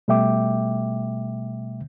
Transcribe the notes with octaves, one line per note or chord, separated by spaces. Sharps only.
B2 G3 A3 E5 G5 D6